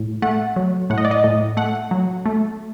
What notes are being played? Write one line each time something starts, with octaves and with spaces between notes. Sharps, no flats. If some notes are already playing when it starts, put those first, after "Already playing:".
Already playing: A2
A3 F#5
F#3
A2 F#5
D#5
D5
D#5
A2
A3 F#5
F#3
A3